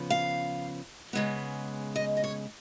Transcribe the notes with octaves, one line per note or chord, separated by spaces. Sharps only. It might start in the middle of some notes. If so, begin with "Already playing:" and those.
Already playing: C#3 F3 B3
F5
C#3 G#3 B3
D#5
D#5
C#5